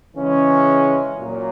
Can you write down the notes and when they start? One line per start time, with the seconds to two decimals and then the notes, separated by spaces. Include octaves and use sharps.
0.16 C#3 E3 G#3 C#4
1.19 A#2 F#3 A#3